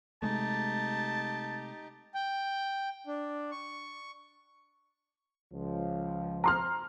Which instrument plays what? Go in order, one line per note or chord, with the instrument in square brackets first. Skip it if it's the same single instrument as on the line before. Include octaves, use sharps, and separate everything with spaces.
[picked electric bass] C3 G#3 A3 [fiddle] D#4 G4 [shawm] A5
[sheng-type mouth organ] G5
D4
C#6
[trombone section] C#2 F3
[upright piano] A#5 C6 F6